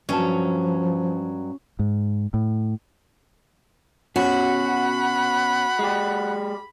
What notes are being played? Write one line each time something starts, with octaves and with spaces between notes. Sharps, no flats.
G2 F3 F#3 C#4 A5
G#2
A2
B2 C#4 F#4 F#5 B5
G#3 G4